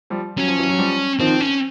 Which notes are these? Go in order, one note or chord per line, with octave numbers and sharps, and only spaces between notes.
F3 G3
F#3 C#4
F3
E3 F#3
F#3
F3 G3
D#3 F3 C4
C#4